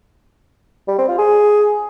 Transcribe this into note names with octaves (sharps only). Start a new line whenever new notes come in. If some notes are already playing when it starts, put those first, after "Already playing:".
G3
C4
F4
G#4